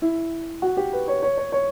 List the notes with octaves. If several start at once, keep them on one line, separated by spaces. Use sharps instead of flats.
E4
F#4
G4
B4
C#5
C#5
C#5
C#5